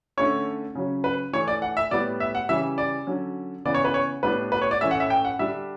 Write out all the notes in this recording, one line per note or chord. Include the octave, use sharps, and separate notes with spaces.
D3 A3 C#4 C#5
C#3 F#3 C#4
B4
E3 A3 D4 C#5
D5
F#5
E5
A2 G3 B3 D5
E5
F#5
C#3 E3 G3 E5
D5
D3 F#3 C#4
C#3 E3 B3 D5
C#5
B4
C#5
A2 G3 B3 D4 B4
B4
C#5
D5
A2 E3 A3 C#4 E5
F#5
E5
G5
F#5
D3 G3 D4 E5